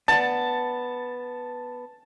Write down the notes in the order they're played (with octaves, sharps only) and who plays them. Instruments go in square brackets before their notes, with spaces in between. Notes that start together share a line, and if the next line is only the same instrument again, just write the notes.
[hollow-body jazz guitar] B3 D5 B5 [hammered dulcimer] A5